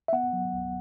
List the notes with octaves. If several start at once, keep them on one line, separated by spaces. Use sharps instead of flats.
E5
B3 F#5
F#3
C#2